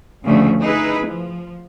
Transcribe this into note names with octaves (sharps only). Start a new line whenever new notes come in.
D2 G2 C#3 F3 A3
D#4 E4 G#4 B4
F3